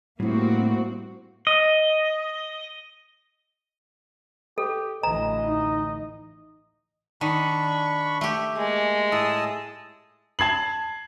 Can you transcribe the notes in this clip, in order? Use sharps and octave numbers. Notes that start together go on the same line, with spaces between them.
A2 G3 A#3 C4 E4 F#4
D#5
G4 A4
A1 D2 E3 D#5 A#5
D#4
D#3 D4 B5 C#6
A3 G4
G#3 A#3
A2 A5 D#6 E6
A5 G#6 C7 F#7